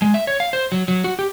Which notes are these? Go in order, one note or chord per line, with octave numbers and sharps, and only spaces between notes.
G#3
E5
C#5
F5
C5
F#3
F#3
F#4
G4